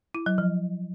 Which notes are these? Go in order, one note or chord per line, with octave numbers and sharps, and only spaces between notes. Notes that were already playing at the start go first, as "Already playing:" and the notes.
E4
F#3
F3